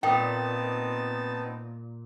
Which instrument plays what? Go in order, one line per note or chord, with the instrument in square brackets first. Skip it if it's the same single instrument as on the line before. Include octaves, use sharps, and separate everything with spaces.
[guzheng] A#2 [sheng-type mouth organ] B3 C4 D#4 [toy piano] G5 D#6 [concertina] A5